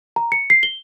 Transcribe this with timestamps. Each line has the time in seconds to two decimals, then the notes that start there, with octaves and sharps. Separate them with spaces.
0.16 A#5
0.32 C#7
0.50 C7
0.63 G7